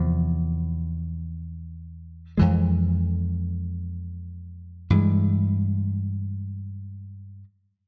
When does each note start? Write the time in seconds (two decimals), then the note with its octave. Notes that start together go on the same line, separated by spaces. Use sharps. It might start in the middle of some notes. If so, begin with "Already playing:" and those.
Already playing: E2 C3 F3
2.38 F2 E3 G#3
4.90 G2 E3 G#3